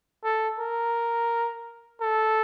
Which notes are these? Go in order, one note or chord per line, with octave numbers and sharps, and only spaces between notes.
A4
A#4
A4